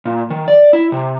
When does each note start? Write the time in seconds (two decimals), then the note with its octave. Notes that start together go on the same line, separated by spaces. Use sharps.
0.05 A#2
0.30 D#3
0.48 D5
0.73 E4
0.92 C3